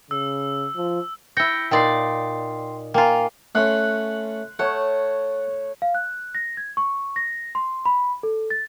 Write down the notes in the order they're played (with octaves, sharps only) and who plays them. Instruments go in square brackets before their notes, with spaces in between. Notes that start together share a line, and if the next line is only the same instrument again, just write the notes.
[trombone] C#3 [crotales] E6
[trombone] F3
[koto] E4 G5 [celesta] G6 A#6 C#7
[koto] A#2 D#4 D5 [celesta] G5 C6 C7
[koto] A#3 F4 [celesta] G5 G#5 A#5
[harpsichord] A3 C#4 [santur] F#5 C6
[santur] A3 C#5 [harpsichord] F#5
[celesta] F5
F#6
A#6
G#6
C#6
A#6
C6
B5
A4
A6